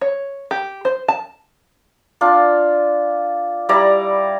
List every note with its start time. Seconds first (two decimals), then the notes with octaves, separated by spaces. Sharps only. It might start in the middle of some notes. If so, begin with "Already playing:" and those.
0.01 C#5
0.51 G4
0.85 C5
1.08 A5
2.21 D4 F4
3.69 G3 E4 D5 A#5